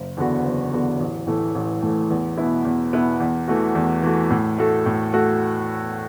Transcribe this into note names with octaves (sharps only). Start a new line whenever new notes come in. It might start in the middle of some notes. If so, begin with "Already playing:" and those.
Already playing: F#1
E2 D3 B3 F#4
F#1
E2 D3 B3 F#4
A1
A2 E3 A3
A1
A2 E3 A3
E2
B2 B3 E4
E2
B2 B3 E4
E2
E3 A3 F#4
E2
E3 A3 F#4
A2
A3 F#4 A4
A2
A3 F#4 A4